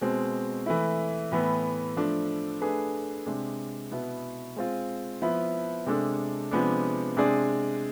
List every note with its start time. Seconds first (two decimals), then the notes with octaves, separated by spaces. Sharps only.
0.01 B2 G#3 C4
0.66 E3 A3 E4
1.32 A2 E3 B3
1.96 F3 A3 D4
2.61 A3 D4 G#4 B4
3.26 C3 G#3 D4
3.91 B2 B3 E4
4.56 G#3 C4 F4
5.22 F3 B3 E4 B4
5.86 C3 G#3 D4 A4
6.51 C3 F3 G#3 B3 D4
7.17 C3 G#3 D4 G#4 D5